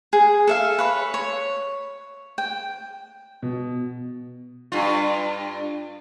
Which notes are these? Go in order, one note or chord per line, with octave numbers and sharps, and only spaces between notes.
G#4
A4 E5 F5
B4 C#5 B5
C#5
G5
B2
G2 F4